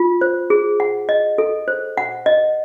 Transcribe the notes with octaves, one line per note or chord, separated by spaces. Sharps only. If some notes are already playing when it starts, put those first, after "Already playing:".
Already playing: F4
C5
G#4
F#5
D#5
A4
C5
F#5
D#5